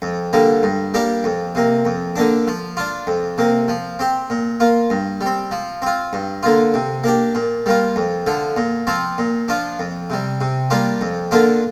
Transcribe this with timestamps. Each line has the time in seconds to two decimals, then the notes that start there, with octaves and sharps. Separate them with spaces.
0.02 F2
0.33 D3 G3 A#3
0.63 G2
0.94 G3 A#3 D4 G4
1.24 F2
1.55 C3 A#3
1.85 F2
2.16 D3 A#3 D4
2.47 F3
2.77 D4 F4
3.07 F2
3.38 C3 A#3
3.68 F3
3.99 C4 G4
4.30 A#2
4.60 A#3 F4
4.90 G2
5.21 G3
5.26 C4
5.51 F3
5.82 C4 F4
6.13 G2
6.43 D3 A#3 F4
6.74 C3
7.04 A#3 D4 G4
7.35 A#2
7.66 G3 A#3 F4
7.96 F2
8.27 D3 F3
8.57 A#2
8.87 F3 C4 F4
9.18 A#2
9.48 F3 D4 F4
9.79 F2
10.10 C3 G3
10.41 C3
10.70 G3 A#3 D4 F4
11.01 F2
11.31 D3 A#3 D4 F4